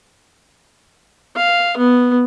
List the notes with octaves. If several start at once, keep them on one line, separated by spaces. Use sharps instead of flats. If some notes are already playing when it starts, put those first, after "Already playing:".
F5
B3